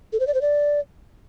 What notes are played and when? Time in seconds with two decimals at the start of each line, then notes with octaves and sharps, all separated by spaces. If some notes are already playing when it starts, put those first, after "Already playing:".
0.13 A4
0.20 C5
0.27 D5
0.34 C5
0.41 D5